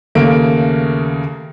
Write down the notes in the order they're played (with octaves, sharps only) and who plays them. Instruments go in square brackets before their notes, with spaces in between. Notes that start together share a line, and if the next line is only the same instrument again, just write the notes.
[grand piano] D#2 C#3 A3 A#3 D7